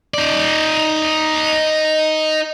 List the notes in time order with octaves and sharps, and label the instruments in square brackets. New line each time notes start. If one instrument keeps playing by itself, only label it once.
[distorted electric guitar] D#4 D5